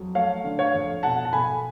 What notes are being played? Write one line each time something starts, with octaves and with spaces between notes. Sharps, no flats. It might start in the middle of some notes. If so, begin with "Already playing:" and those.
Already playing: F2 F#3
A3 C#5 F5
D3
C#5 F5
F2
B2 F#5 A5
A5
B1 G#5 B5